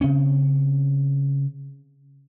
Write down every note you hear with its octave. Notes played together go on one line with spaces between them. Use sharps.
C#3 C4 C#4